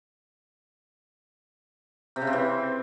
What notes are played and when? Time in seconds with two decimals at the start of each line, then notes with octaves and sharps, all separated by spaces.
2.16 C3
2.22 C#3
2.27 C4
2.33 E3